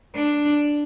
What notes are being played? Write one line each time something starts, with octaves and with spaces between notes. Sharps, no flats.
D4